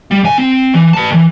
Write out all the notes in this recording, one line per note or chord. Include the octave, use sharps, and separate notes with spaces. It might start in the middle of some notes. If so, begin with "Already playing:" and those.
G3
C#3 G#5
C4
E3
B4 A5
D2 E3